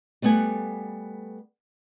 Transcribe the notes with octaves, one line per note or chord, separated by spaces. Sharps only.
G3 A3 B3 F#5 G#5